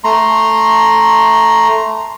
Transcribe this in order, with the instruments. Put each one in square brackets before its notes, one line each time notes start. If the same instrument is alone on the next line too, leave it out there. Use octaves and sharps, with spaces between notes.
[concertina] A3 A#5 C6